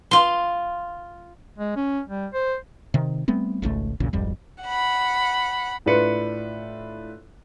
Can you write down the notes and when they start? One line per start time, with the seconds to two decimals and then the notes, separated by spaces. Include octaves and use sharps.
0.11 F4 C6
1.58 G#3
1.76 C#4
2.09 G3
2.33 C5
2.94 C3 D#3
3.28 G3 A3 B3 C4
3.62 G#1 C#2 C3 A3
4.00 A#1 E2 A#2 C#3
4.13 D1 G#1 F2 G3
4.63 F#5 B5
5.86 A2 D4 F4 B4 C#7